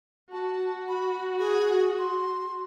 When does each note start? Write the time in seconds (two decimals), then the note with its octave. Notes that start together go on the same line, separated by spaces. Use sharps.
0.32 F#4 A5
0.88 B5
1.39 G#4
1.99 C6